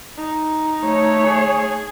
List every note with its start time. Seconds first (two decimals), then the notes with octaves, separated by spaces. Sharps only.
0.18 D#4
0.82 A3 C#5
1.26 G#4